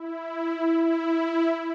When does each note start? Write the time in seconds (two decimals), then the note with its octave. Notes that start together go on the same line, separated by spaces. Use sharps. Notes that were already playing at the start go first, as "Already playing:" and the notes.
Already playing: E4
0.85 E4